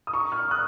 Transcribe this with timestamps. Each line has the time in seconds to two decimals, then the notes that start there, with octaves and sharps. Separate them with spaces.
0.07 D#6
0.14 A#5 C#6
0.32 C#6 F6
0.51 D#6 F#6